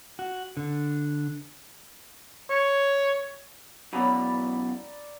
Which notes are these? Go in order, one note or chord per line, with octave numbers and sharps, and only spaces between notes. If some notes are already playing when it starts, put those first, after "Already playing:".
F#4
D3
C#5
F#2 B2 E3 D5 A#5 B5